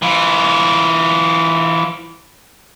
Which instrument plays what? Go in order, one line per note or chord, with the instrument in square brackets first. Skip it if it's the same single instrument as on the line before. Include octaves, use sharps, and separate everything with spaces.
[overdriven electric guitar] E3 F4